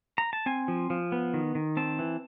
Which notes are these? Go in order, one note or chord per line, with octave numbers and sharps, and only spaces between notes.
A#5
A5
C4 G#5
F3
F3
B3
D#3
D#3
C4 A5
E3